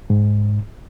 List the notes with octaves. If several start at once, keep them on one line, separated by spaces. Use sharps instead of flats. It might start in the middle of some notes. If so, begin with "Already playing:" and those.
G#2